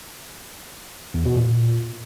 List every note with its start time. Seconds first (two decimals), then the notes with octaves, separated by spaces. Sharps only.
1.14 E2
1.26 B2
1.37 A#2